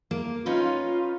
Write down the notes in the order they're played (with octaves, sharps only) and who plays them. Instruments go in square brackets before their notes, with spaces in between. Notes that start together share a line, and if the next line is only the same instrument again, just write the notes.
[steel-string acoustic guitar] A#3
[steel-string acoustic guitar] C#4 D#4 B4 [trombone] F4